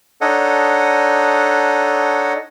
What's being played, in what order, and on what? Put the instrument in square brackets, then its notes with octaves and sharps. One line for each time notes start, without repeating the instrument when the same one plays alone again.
[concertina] D4 D#4 A4 C#5 D#5 F#5